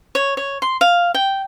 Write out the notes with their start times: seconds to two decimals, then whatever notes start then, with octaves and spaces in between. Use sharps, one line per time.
0.15 C#5
0.37 C#5
0.62 C6
0.81 F5
1.14 G5